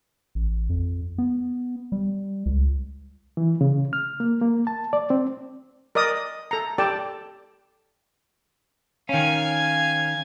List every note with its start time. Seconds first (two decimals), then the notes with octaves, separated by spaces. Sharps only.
0.35 A1
0.70 F2
1.18 B3
1.92 G3
2.46 C#2
3.37 E3
3.61 C#3
3.93 F6
4.20 A#3
4.41 A#3
4.67 A5
4.93 D5
5.10 C4
5.95 A#4 D5 D#5 D#6
6.51 A4 A#5
6.78 G4 A4 D5 G5 A5
9.09 D#3 C#4 F5 G#5